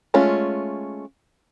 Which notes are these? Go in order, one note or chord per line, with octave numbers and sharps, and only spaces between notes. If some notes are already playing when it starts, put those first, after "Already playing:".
G#3 A3 C#4 F4